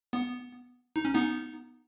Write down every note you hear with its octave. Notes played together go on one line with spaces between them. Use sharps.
B3
D#4
C#4
B3 D#4